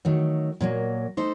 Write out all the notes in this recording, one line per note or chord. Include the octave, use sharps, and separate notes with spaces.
D#3 F#3 A3
A#2 F#3 A#3
A3 D#4 A4 C5